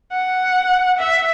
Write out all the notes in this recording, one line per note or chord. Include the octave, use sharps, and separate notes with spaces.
F#5
E5